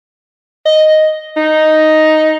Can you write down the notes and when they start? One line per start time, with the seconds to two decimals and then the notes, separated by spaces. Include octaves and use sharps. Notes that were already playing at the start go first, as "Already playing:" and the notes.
0.66 D#5
1.37 D#4